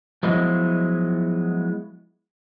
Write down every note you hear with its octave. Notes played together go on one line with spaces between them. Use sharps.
F3 F#3 G#3 B3 E4 D#5